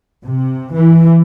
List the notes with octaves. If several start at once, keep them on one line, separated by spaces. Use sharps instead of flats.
C3
E3